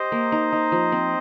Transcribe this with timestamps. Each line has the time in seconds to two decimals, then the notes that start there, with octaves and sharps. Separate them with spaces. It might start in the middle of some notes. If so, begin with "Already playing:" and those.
Already playing: G4 C5 D#5
0.12 A#3
0.32 D#4
0.53 D#4
0.72 F3
0.92 C4